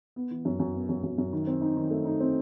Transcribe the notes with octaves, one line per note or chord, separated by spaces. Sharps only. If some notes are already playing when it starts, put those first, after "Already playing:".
B3
E3
F#2
F#2
B3
F#2
F#2
F#2
D#3
C4
D#4
D#3
A3
D#4
C4